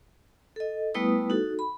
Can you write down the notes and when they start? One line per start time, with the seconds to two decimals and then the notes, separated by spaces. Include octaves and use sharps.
0.56 A4 D#5
0.94 G3 A3 B3 E4 B4 D#6
1.30 D#4 F#4 A4
1.59 B5